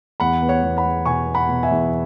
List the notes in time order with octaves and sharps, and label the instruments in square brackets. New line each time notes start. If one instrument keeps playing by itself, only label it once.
[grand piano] E2 F#5 B5
B3
C#5 F#5
E2
F#5 B5
E2
B2 G#5 C#6
B3
F#5 B5
B2
E5 G#5
E2